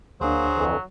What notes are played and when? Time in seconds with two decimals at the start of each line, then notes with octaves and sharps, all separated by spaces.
0.21 D2 F#3 A#3 D4 G#4 C5
0.55 F2 D3 E3